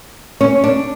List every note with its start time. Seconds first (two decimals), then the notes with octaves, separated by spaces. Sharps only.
0.41 C#4
0.64 D4